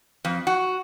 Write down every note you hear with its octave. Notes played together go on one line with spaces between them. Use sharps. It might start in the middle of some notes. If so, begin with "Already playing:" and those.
F2
F#4